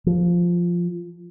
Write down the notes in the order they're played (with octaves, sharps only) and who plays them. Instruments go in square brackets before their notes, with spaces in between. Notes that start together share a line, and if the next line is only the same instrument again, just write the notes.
[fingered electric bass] F3